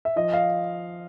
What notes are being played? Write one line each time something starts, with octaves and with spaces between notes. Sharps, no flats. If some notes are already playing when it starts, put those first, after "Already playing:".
E5
F3 D#5
F5